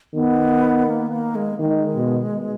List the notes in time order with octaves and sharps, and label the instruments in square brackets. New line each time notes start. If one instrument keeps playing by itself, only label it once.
[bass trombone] D#3 [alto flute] B3
[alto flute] A#3
A#3
G#3
[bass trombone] D#3 [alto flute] G#3
[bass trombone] B2